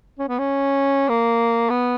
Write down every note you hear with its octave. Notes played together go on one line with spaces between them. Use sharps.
C#4
B3
C#4
A#3
B3